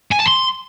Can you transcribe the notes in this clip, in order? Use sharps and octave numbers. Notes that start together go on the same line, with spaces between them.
G#5
A5
C6